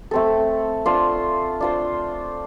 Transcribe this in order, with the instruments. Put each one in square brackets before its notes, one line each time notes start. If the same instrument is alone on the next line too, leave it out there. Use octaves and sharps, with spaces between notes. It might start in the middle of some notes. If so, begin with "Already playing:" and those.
[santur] A3 C4 A4
D4 F4 C5
D4 F4 C5